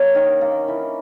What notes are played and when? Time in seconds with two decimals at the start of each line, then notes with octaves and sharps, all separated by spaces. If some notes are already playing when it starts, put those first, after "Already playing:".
Already playing: A#3 C#4 A#4 C#5
0.15 D#3
0.41 A#3
0.68 E3